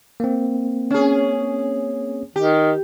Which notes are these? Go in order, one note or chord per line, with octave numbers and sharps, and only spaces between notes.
A#3 C4
C#4 G#4
D#3 G4